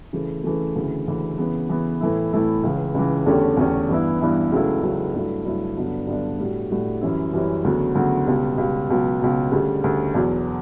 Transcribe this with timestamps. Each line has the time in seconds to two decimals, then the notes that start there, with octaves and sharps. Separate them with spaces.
0.13 C#3 E3 A3
0.44 C#3 E3 A3
0.76 D2 C#3 E3
1.07 D2 C#3 E3
1.38 C#3 E3 B3
1.69 C#3 E3 B3
2.00 A2 E3 A3 E4
2.33 A2 E3 A3 E4
2.63 C#2 C#3 E3
2.94 C#2 C#3 E3
3.26 E2 D3 A3 C#4 G4
3.57 E2 D3 A3 C#4 G4
3.89 G2 E3 B3 E4
4.20 G2 E3 B3 E4
4.52 C#2 C#3 F#3 A3 E4
4.82 C#2 C#3 F#3 A3 E4
5.14 G2 F#3 A3 E4
5.45 G2 F#3 A3 E4
5.77 G2 D3 F#3 B3 D4
6.07 G2 D3 F#3 B3 D4
6.39 A2 G3 D4 F#4
6.70 A2 G3 D4 F#4
7.01 F#2 E3 G3 C#4 E4
7.33 F#2 E3 G3 C#4 E4
7.64 D2 C#3 F#3 B3 F#4
7.95 D2 C#3 F#3 B3 F#4
8.27 C#2 B2 G3
8.58 C#2 B2 G3
8.90 C#2 B2 F#3
9.21 C#2 B2 F#3
9.52 D2 C#3 G3
9.83 D2 C#3 G3
10.15 E2 B2 F#3 B3